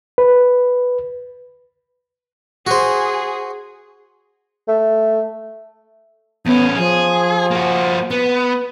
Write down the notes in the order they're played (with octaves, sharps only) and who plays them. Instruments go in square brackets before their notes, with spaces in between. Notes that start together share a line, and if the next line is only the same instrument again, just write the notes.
[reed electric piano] B4
[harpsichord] F#4 C5 [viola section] G#4
[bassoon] A3
[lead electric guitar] E2 C#4 [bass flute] B3
[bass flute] F3 [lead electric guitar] G#4
[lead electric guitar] A#3 F#4
[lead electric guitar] B3 [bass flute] B4